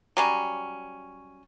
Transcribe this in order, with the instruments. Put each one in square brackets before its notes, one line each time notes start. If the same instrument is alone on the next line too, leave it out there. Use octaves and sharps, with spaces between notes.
[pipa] F#3 G3 C#4